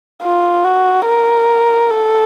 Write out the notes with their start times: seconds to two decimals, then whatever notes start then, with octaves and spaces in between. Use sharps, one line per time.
0.23 F4
0.64 F#4
1.07 A#4
1.90 A4